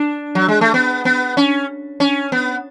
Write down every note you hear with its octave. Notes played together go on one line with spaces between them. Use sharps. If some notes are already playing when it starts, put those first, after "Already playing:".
Already playing: D4
F#3
G#3
A3
B3
B3
C#4
C#4
B3